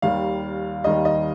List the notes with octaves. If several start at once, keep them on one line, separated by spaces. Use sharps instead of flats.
D#2 D#3 G3 F5
D#2 D#3 G3 D#5
D#5